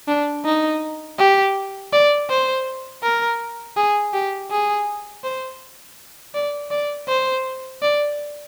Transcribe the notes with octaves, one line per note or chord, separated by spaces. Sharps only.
D4
D#4
G4
D5
C5
A#4
G#4
G4
G#4
C5
D5
D5
C5
D5